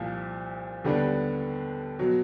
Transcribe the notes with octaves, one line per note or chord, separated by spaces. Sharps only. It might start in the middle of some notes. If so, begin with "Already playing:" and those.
Already playing: C2 A#2 F3
D#2 D3 G3 B3 D4
B2 F#3